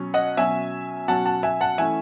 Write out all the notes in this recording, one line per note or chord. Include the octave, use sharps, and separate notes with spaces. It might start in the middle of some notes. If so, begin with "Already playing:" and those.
Already playing: B2 F#3 C#4
D#5 F#5
B2 F#3 C#4 E5 G#5
B2 F#3 C#4 F#5 A5
F#5 A5
E5 G#5
F#5 A5
E3 A3 C#4 E5 G#5